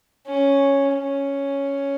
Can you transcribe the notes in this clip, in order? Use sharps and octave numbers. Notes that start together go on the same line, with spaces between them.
C#4
C#4